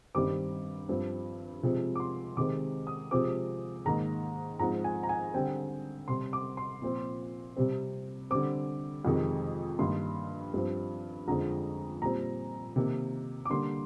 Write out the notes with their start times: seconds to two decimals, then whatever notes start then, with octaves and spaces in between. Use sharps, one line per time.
0.15 G2 D#3 G3 C4 D6
0.89 G2 F3 C4
1.63 C3 F3 G#3 C4
1.95 D6
2.00 C6
2.37 C3 D#3 G#3 C4 D6
2.87 D#6
3.11 C3 F3 G#3 C4 D6
3.85 G#2 D#3 A#3 A#5
4.59 G#2 F3 C4 A#5
4.84 G#5
5.03 A#5
5.09 G#5
5.34 D3 G3 C4 G5
6.08 C3 G3 C4 C6
6.33 D6
6.57 C6
6.82 A#2 F3 C4
7.56 C3 G3 C4
8.31 D3 G3 C4 D6
9.05 F2 C3 D#3 G#3
9.79 G2 D#3 A#3 C6
10.54 G2 F3 C4
11.28 F2 D3 F3 G#3 C4 A#5
12.02 A#2 G3 C4 A#5
12.76 C3 D#3 A#3
13.45 D6
13.50 D3 G3 A#3 C6